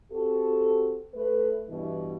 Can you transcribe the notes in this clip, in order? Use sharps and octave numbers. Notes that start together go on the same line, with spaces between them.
C4 F#4 G4 A4
A3 B4
G2 B2 E3